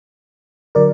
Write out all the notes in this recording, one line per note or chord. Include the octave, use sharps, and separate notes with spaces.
D3 F#3 A#4 D5